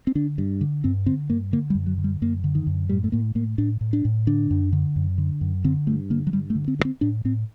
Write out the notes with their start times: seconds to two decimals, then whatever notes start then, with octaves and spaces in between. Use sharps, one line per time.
0.07 C4
0.15 D3 D4
0.38 G2
0.61 D3
0.84 G2 C4
1.06 D3 C4
1.30 G2 A#3
1.52 D3 A#3
1.70 G3
1.75 F#2
1.86 F#3
1.98 D3
2.04 G3
2.22 F#2 A#3
2.44 D3
2.55 D#3
2.67 F#2
2.89 A2 G3
3.04 A3
3.12 A2 A#3
3.35 A2 A#3
3.58 A2 D4
3.81 A2
3.93 D4
4.05 A2
4.27 D3 D4
4.51 F#2
4.73 D3
4.96 F#2
5.18 D3
5.41 F#2
5.64 D3 C4
5.87 G2 A3
6.10 D3 A#3
6.27 F#3
6.32 G2 G3
6.50 A3
6.55 D3
6.68 C4
6.79 G2
6.85 C4
7.01 A2 D4
7.25 A2 C4